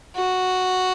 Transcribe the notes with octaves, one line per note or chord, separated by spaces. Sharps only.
F#4